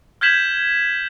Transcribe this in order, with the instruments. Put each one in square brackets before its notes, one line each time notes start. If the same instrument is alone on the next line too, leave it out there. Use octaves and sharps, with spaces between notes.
[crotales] F6 G6 G#6 B6 E7 F#7